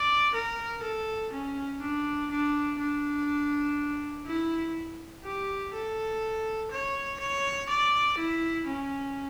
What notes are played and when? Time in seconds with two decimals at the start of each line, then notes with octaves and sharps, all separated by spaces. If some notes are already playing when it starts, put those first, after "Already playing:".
Already playing: D5
0.35 A#4
0.83 A4
1.33 C#4
1.81 D4
2.31 D4
2.79 D4
4.27 E4
5.24 G4
5.73 A4
6.72 C#5
7.20 C#5
7.70 D5
8.18 E4
8.68 C#4